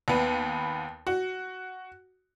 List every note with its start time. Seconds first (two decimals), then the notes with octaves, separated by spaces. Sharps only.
0.08 D#2 B3
1.07 F#4